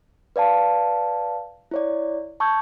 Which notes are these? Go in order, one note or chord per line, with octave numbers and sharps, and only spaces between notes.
B4 D5 F5 A5
E4 C#5 D5
A5 C#6 E6 G6 G#6